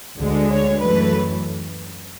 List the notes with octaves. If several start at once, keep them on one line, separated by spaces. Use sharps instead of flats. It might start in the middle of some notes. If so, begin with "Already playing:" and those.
D2 D3 G#3
C#5
F#2 E3 A3 B4